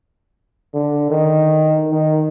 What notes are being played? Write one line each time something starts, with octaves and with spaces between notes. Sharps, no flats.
D3
D#3
D#3